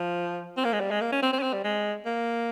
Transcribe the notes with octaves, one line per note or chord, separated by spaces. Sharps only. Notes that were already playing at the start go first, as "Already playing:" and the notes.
Already playing: F3
C4
A#3
G#3
G3
G#3
A#3
C#4
C4
C4
C#4
C4
G3
G#3
A#3